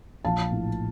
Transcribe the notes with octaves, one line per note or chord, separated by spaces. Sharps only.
A#1 F5 A5
A2